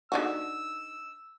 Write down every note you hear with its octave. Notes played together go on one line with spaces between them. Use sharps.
D3 D#4 F#4 E6